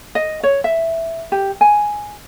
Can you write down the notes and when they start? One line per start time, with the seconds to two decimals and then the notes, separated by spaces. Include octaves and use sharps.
0.15 D#5
0.43 C#5
0.64 E5
1.32 G4
1.61 G#5